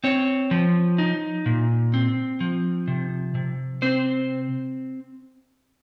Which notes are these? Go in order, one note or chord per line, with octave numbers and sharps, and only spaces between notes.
C4 C#5
F3
D#4
A#2
C4
F3
C3
C3
C4 C5